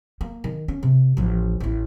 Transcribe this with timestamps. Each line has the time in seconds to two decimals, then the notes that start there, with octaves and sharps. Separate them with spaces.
0.21 A#3
0.44 D#3
0.68 C#4
0.83 C3
1.17 A1 F3
1.60 A1 E4